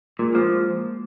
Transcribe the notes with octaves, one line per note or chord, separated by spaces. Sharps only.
A#2 G#3
F3 A#3